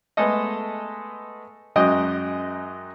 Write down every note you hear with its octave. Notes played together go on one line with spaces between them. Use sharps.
G#3 A3 B3 A4 D#5
F#2 F#3 G#3 D#5 G5